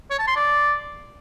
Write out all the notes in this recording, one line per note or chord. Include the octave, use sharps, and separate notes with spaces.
C#5
A5
C6
D5